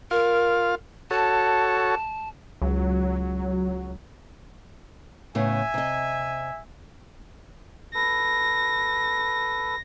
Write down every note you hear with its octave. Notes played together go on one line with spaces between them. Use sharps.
F4 A#4 F5
F#4 A4 C#5 A5
C#2 F#3
A2 C#3 B3 E5 G#5
C3 D#5
A4 B4 A#6